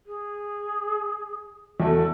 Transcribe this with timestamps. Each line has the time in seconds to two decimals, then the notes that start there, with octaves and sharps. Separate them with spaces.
0.06 G#4
1.80 E2 A3 F#4 A4